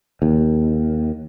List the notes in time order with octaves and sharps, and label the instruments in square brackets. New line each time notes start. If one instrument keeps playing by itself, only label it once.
[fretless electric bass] D#2